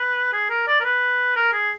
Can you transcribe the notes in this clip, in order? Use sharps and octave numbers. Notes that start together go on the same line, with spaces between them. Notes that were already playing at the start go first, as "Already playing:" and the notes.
Already playing: B4
G#4
A#4
D5
A#4
B4
A#4
G#4